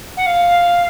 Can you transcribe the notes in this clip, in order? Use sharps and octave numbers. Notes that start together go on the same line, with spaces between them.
F#5
F5